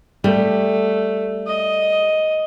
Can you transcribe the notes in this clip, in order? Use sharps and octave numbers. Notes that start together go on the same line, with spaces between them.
G3 A3
D#5